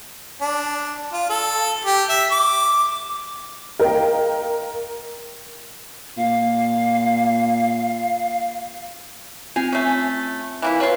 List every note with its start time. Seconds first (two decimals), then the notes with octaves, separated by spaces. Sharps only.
0.41 D4
1.13 F4
1.30 A4
1.85 G4
2.09 E5
2.31 D6
3.80 A#4 D#5 F5 G5
6.17 A#2 F5
9.56 C4 F4 G#5
9.73 A3 C#4
10.62 E3 A#3 E4
10.80 F#3 F4 B4 C#5 C7